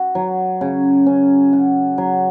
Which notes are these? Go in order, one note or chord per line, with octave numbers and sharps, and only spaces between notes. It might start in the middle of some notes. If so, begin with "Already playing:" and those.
Already playing: F#4
F#3
C#3
C#4
F#4
F#3